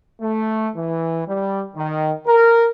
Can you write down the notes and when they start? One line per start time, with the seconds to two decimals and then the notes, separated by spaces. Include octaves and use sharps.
0.21 A3
0.75 E3
1.27 G3
1.76 D#3
2.26 A#4